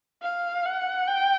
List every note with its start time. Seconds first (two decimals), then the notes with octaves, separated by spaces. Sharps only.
0.23 F5
0.66 F#5
1.08 G5